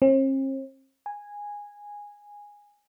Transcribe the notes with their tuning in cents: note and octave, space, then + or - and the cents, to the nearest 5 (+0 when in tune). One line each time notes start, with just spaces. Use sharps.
C4 +45
G#5 -10